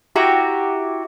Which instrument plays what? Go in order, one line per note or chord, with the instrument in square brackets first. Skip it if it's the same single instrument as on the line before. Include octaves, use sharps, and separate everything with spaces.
[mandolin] E4 F#4 G4 A#5